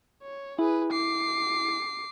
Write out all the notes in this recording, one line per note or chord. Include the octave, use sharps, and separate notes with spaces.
C#5
E4 G#4 B4
D6 C7